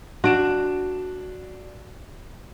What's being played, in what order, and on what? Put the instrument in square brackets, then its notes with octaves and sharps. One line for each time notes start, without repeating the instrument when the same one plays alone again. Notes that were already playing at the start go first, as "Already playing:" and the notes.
[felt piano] D4 D7 E7 [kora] F#4